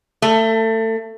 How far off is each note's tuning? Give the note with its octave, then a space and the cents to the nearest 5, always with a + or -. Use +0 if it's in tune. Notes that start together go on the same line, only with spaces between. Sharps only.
A3 +25